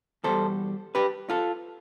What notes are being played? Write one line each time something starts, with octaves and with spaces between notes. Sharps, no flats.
E2 B2 G3 A4 C5
G4 B4
F4 A4